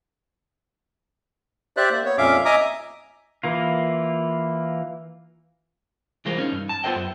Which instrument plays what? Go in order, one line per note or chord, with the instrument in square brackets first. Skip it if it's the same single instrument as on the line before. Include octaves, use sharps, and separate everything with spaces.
[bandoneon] G4 C5 D5 E5 F#6
A#3
B3 C#5
F2 A#2 C#4 E5 F5 D6
D#5 E5 G#5 A#5 D6 D#6
[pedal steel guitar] E3 A#3 F4
[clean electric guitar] C2 E3 G#3 F4 A#4 C5
C#4 D#4
G2
A5
B3 F4 A4 C5 D#5 G5
F#2